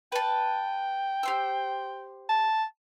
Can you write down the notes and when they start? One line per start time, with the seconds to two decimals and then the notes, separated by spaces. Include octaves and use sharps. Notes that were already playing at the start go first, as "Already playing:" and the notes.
0.12 B4 G5 A5
1.23 G4 C5 E6
2.29 A5